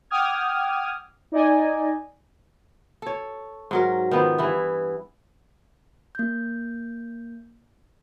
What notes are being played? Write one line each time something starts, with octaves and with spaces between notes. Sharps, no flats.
F#5 G5 D6 D#6 F6 G#6
D#4 D5 D#5 G#5
A4 C#5
G#2 F#3 A#4
D#3 F3 B3
G2 E3 E4
A#3 G6